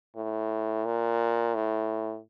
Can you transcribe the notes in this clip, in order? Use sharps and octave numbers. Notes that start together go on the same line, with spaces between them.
A2
A#2
A2